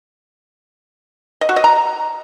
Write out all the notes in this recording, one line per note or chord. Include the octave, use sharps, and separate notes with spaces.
D#5
F#4
D#5
A#5